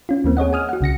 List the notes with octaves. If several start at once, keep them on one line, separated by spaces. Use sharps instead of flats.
C#4 F4
D#2 E3 A#3 C4
G#4 C#5 D#5 F#5
G#5 D#6 F6
F#4 F#5
C2 C#3 A#6 C#7